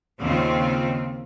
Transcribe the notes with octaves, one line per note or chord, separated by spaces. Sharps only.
D#2 C#3 C4 F4